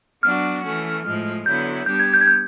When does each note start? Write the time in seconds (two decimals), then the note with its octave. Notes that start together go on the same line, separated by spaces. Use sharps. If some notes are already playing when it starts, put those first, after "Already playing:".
0.23 F#3 B3 D4 F#4 F6
0.64 E3 A3 C#4
1.04 A2 F3 G#3
1.46 D3 F#3 B3 E4 G6
1.86 G3 B3 D4 G4 G6
1.99 G#6
2.14 G6
2.21 G#6
2.27 G6